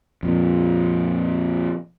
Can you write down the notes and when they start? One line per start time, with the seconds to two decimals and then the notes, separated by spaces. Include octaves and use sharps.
0.23 F2 A#2